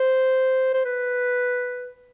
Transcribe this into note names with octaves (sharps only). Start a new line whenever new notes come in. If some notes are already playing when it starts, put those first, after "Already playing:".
Already playing: C5
C5
B4